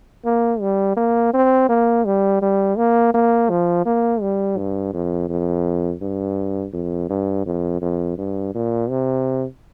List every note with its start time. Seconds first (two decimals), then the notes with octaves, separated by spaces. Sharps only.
0.25 A#3
0.61 G3
0.97 A#3
1.33 C4
1.69 A#3
2.05 G3
2.42 G3
2.77 A#3
3.14 A#3
3.50 F3
3.86 A#3
4.21 G3
4.57 G2
4.93 F2
5.29 F2
6.02 G2
6.73 F2
7.10 G2
7.46 F2
7.81 F2
8.18 G2
8.54 A#2
8.89 C3